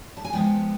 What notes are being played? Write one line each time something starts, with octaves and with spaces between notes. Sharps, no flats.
A5
G#5
F3 G#3 B3 G5